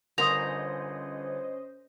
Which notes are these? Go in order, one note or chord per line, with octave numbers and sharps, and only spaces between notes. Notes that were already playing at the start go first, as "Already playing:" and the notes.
G1 C#4 A#4 C5 D#5 A#5 C6 D#6